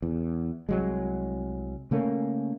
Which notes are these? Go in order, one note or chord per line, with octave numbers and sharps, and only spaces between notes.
E2
C2 F#3 G#3
C#3 A3 A#3 C#4